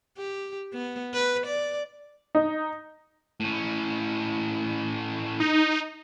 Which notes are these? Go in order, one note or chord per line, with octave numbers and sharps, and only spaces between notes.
G4
B3
B4
D5
D#4
A2 C#4
D#4